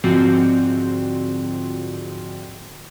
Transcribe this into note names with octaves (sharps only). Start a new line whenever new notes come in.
G#2 D3 F3 C4 F4 F#4